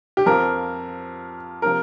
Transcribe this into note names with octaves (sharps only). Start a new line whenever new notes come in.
G4
F2 F3 A#4
C3 F3 A#4